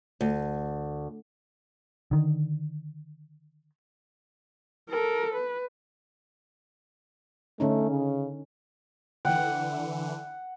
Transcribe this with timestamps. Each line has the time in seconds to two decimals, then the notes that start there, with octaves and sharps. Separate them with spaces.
0.21 D2
2.11 D3 D#3
4.89 A4 A#4
5.35 B4
7.60 D3 A3 C#4 D#4
7.90 C#3
9.25 D3 E3 F#5 G5